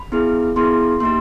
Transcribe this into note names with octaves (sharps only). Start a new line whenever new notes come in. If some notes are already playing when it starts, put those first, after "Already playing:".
Already playing: B5
B3 E4 G#4
B3 E4 G#4 C6
A#3 D#4 G4 C6